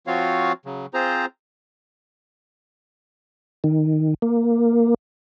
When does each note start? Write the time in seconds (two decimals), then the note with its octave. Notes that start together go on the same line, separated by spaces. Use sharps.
0.07 F3 C4 F4 F#4 C#5 F5
0.66 C#3 F#3
0.94 C4 F4 G#4 C5 A#5
3.64 D#3
4.22 A#3